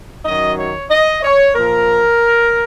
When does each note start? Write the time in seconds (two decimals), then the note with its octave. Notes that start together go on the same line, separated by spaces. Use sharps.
0.25 F#2 D#3 F#3 D#5
0.57 C#5
0.90 D#5
1.23 C#5
1.55 A#2 F3 A#4